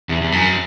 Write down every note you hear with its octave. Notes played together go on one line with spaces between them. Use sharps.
E2
E2
F#2